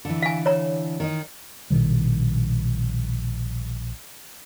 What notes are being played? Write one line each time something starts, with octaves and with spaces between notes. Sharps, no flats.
D3 E3
F5 G#5
C#5 A#5
D#3 D#4
A#1 B2 D#3 G3